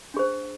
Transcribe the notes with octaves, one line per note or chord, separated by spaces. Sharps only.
D4 G#4 C5